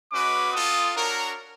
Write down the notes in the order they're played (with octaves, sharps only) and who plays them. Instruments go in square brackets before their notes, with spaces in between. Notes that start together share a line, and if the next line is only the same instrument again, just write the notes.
[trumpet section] G#3 C#4 F#4 B4 D#5 [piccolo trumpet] D6
[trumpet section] C4 F4 A4 [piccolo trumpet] D#6
[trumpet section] D4 F#4 A#4 C#5